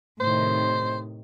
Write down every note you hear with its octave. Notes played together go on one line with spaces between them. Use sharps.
A2 C3 D#3 C5